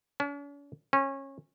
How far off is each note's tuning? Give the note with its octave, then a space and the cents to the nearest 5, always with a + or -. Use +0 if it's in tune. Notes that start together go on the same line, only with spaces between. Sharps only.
C#4 +45
C#4 -25